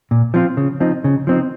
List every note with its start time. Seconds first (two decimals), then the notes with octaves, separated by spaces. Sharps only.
0.11 A#2
0.34 F3 C4 F4
0.57 C#3
0.80 F3 C4 D#4
1.04 C#3
1.27 F3 C4 D#4